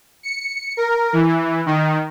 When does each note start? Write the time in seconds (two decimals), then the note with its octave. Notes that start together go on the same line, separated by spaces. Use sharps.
0.23 C#7
0.77 A#4
1.13 E3
1.66 D#3